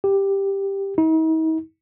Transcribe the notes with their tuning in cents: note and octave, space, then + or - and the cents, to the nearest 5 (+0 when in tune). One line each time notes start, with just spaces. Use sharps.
G4 +5
D#4 +45